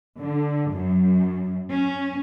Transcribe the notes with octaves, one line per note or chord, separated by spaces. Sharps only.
D3
F#2
C#4